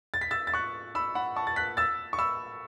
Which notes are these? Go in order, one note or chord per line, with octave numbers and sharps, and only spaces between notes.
A6
B6
E6 A6
A6
C#6 F#6
B5 E6
F#5 B5
A5 C#6
A6
F#6 B6
E6 A6
C#6
B5 E6